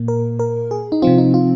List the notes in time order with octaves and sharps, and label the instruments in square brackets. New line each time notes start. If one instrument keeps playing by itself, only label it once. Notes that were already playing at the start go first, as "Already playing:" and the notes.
Already playing: [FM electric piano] A#2 A#3
A#4
A#4
G#4
D#4
C3 F3 C4 F4
D#4
F4